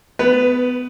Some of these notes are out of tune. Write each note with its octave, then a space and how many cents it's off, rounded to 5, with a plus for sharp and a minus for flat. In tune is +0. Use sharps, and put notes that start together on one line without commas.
B3 +20 B4 +0